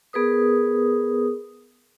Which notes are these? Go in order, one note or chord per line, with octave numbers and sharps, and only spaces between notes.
B3 G#4 A#4 B4 D#6